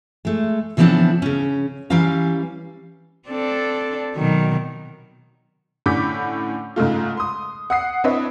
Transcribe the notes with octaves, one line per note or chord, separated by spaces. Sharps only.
G#3 A3
C#3 E3 F3 B3 C4 D4
C#3 C#4
E3 G3 C#4 B4 F5 A#5
C4 D4 A4
B2 D#3 F#3
A2 D3 C#4 D6 G6 B6
G#2 C#3 G#3 A3 F4
C6 D#6
F#5 D#6 C7
C4 D4 E4 B4 C#5 D#5